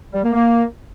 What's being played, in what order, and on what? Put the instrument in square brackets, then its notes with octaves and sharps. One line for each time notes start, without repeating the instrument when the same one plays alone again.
[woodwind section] G3
A#3
A#3